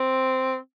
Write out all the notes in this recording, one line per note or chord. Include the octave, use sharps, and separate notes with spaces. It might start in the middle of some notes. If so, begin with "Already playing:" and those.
Already playing: C4